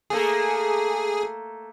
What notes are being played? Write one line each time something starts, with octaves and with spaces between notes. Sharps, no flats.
A3 A#3 G#4 A4